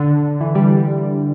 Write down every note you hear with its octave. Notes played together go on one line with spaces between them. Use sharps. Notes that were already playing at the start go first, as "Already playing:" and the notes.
Already playing: D3
E3
G3